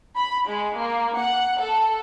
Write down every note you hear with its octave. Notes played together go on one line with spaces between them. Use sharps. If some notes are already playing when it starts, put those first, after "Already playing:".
B5
G#3
A#3
F#5
A4